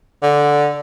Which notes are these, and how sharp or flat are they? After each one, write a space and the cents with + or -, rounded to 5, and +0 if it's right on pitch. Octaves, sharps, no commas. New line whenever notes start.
D3 -5